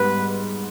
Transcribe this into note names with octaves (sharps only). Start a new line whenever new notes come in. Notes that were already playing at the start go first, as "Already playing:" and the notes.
Already playing: G#2 G3 B3 B4